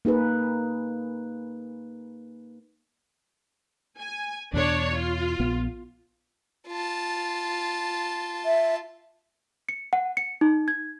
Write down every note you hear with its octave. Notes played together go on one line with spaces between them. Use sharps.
A#3 D#4 G#4 B4
G#5
E2 B2 D4 C#5
F4
A#1 B3
F4 A5
E5
C#7
F#5
C#7
D#4
G#6